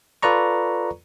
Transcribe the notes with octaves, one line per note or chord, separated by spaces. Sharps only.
F4 A4 B4 D5 A#5 C#6